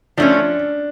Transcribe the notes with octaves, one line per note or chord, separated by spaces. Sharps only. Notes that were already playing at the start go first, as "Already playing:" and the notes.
F3 A3 C#4 D4